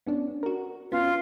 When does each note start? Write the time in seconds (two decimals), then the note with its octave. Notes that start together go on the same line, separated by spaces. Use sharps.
0.07 B3 C#4 D4
0.43 F#4 A#4
0.92 B3 C#4 F4